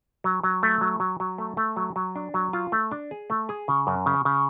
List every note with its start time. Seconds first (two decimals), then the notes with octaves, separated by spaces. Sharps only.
0.24 F#3
0.44 F#3
0.63 A3
0.81 F#3
1.00 F#3
1.20 F#3
1.38 A3
1.57 A3
1.77 F#3
1.96 F#3
2.16 D4
2.34 F#3
2.53 F4
2.72 A3
2.91 D4
3.11 G#4
3.30 A3
3.49 G#4
3.68 C#3
3.87 F#2
4.06 C#3
4.25 C#3